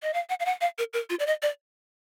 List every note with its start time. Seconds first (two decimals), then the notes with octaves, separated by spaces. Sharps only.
0.02 D#5
0.14 F5
0.29 F#5
0.40 F5
0.45 F#5
0.61 F5
0.78 A#4
0.93 A#4
1.10 F4
1.19 D5
1.27 D#5
1.42 D5